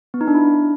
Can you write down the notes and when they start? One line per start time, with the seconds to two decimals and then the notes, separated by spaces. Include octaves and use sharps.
0.14 B3
0.21 D#4
0.28 D4
0.34 E4
0.41 D4